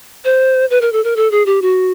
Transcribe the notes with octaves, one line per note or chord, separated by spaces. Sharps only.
C5
B4
A#4
A4
A#4
A4
G#4
G4
F#4